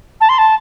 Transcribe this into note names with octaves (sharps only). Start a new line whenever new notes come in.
A5
C6
A5